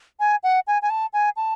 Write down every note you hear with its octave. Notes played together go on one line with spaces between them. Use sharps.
G#5
F#5
G#5
G#5
A5
G#5
A5